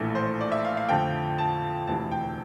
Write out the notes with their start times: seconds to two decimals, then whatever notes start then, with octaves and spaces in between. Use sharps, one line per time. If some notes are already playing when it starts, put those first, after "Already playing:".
Already playing: A#1 A2 E3 A3
0.15 C5
0.41 D5
0.52 E5
0.65 F5
0.77 F5
0.89 F2 D3 F3 A3 G5
1.38 A5
1.87 E1 D2 C3 E3 A5
2.11 G5